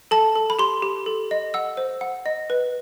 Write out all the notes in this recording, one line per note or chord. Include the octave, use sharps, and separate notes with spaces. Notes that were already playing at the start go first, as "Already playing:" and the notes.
A4 A5
A4
B5
G4 C6
G4
A4
D#5
F#5 E6
C5
F#5
D#5
B4